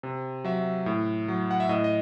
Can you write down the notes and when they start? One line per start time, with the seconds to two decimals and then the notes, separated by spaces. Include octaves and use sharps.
0.03 C3
0.44 F#3 E5
0.86 A2
1.28 F#3
1.51 F#5
1.60 E5
1.69 A2 D#5
1.84 D#5